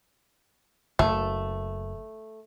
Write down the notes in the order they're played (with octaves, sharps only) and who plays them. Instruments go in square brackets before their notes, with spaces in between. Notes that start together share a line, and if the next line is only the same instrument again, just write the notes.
[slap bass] F#1 [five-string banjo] A3